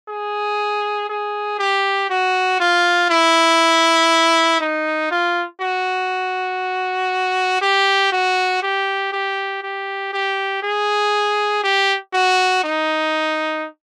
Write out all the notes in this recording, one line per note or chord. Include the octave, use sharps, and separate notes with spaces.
G#4
G#4
G4
F#4
F4
E4
D#4
F4
F#4
G4
F#4
G4
G4
G4
G4
G#4
G4
F#4
D#4